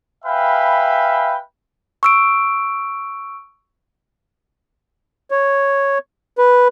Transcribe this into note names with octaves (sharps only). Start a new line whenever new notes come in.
B4 E5 F5 G5 G#5 B5
C#6 E6 D7
C#5
B4